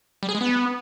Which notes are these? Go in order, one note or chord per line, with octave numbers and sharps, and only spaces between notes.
G3
G#4
G#3
B3